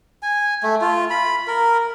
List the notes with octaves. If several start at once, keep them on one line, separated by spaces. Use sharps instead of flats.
G#5
A3
F4
B5
A#4